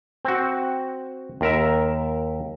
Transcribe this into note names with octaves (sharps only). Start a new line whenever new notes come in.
C4 F#4
D#2 A#4 E5